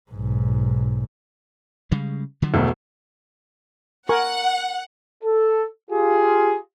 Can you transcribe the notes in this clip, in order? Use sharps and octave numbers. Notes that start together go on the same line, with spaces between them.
B1 G#2
C#3 G3 G#3
D3 F3 F#3
E1 B1 A3
A#4 F#5 G#5 C#6
A4
F4 G4 G#4